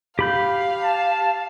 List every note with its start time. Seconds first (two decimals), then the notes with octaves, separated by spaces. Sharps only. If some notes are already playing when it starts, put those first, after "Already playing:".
0.19 G4 F5 B5 G6
0.82 A5